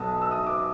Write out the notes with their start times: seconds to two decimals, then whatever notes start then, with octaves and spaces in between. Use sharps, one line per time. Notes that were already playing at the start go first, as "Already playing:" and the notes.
Already playing: B1 B2 F#3 A5 D#6
0.22 E6
0.31 D#6
0.47 D6